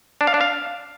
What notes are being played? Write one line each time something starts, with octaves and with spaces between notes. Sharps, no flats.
D4
F5
D4
F5